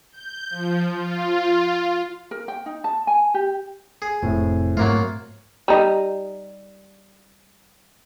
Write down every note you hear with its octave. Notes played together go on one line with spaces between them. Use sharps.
G6
F3
F4
A#4
G5
D#4
A5
G#5
G4
G#4
F1 A2 C4
G#2 F#3 A3 A#3 F4
G3 D#4